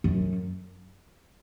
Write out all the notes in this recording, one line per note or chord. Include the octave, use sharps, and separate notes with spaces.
F#2